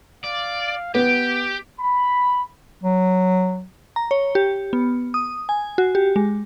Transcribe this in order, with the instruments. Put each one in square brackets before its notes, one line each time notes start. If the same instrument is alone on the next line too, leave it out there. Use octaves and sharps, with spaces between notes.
[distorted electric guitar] D5 [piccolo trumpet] F5
[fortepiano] B3 [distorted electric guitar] G4 [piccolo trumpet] G6
[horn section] B5
[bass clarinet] F#3
[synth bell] A#5
C#5
G4
B3
D#6
G#5
F#4
G4
G#3